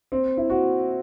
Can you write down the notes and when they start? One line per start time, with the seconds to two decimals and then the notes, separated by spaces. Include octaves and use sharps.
0.12 C4
0.37 E4
0.50 F#4